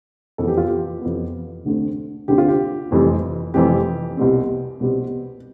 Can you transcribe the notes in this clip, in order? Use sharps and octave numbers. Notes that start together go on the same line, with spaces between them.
F2 E3 B3 A4
G4
F4
G4
F2 E3 B3
D2 D3 A3 C4
D2 D3 A3 C4 G4
F4
G4
F1 F2 E3 G3 C4
F1 F2 E3 G3 C4 G4
C2 B2 G3 C4
C2 B2 G3 C4